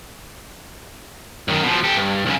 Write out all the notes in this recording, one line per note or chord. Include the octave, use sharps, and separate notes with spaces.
F#2 D#3
B2 F3
G4 A4
G2
B1 C#3